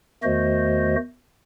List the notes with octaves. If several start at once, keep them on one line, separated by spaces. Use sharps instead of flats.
E2 D#3 A3 F#4 C5 D#5